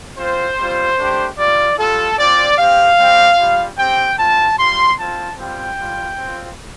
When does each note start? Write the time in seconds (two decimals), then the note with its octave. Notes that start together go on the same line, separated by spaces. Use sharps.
0.17 C4 F4 C5
0.57 G3 C4 F4
0.97 A3 D4 G4
1.37 G3 F4 D5
1.77 G3 F4 A4
2.17 C4 F4 D5
2.57 C4 G4 F5
2.97 G3 C4 G4
3.37 G3 F4
3.77 C4 G4 G5
4.17 C4 F4 A5
4.58 G3 F4 C6
4.97 C4 F4 A5
5.37 G3 C4 F4 G5
5.78 G3 F4
6.17 C4 F4